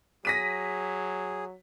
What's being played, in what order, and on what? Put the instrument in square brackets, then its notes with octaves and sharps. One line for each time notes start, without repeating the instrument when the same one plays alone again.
[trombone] F#3 [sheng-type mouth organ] G#4 [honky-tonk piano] A#6 B6 D#7